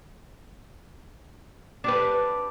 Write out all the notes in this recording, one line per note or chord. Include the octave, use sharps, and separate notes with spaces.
D4 G4 B4